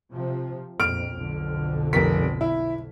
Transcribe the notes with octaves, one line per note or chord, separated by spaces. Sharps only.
C3 F3
A#1 F2 F6 D7
B1 F2 D3
F1 A#4 B6
E4